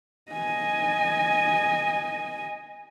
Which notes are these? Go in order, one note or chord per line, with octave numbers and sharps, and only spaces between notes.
D#5 G#5